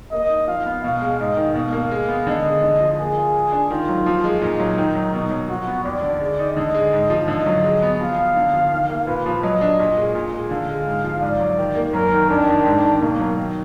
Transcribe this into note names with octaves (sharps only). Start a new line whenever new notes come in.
A#3 D#5
D#4
F3 F5
B3
B2 F5
G#3
G#2 D#5
D#3
B2 F5
A#3
G#3
B3
D3 D#5
G#3
D3
F3
A#3 G#4
F4
G#3
D4
D#3 F4
F#3
F3
G#3
A#2 D#4
F#3
D#3
F#3
B2
F#3
F3 F#4
B3
D#2 D5
D3
G#3
D#4
D3 D#5
G#3
G#2
F3
D3 D#5
F#3
G#3
B3
F3 F5
B3
D3
F3
D#3
A#3
A#2 B4
F3
F#3 D#5
D4
A#2
G#3
A#2
G#3
D3 F5
G#3
G#2
F3
G#2 D5
F#3
D#3
A#3
F#2 A#4
D#3
F2 D4
D#3
G#2
D#3
B2 A#3
F#3
D#3